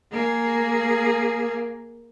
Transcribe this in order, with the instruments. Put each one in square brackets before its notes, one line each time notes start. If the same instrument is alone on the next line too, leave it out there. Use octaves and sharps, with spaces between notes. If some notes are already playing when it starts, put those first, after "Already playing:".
[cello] A#3 G#4